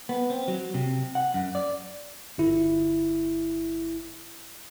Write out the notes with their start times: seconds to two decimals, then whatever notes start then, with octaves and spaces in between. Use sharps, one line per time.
0.09 B3
0.30 C4
0.48 F#3
0.74 C3
1.15 F#5
1.34 F#2
1.55 D5
2.38 G1 E4